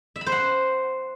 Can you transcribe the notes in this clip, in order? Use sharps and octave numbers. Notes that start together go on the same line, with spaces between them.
E5
B5
C5
F#5